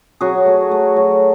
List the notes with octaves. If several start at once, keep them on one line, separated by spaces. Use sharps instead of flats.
F#3 F#4 G#4
A3
A3
F#3